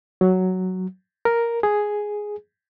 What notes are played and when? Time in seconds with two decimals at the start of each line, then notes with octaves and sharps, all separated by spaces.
0.21 F#3
1.25 A#4
1.63 G#4